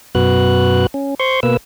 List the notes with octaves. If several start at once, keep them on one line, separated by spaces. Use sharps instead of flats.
F#2 B2 F#4 B4 F#6
C#4
C5 C6 C#6
B2 A#3 B4 E6